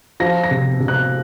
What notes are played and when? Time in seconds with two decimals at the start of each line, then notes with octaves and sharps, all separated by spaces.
0.20 F3 A#6
0.44 A#6
0.51 C3
0.80 C3
0.88 F#6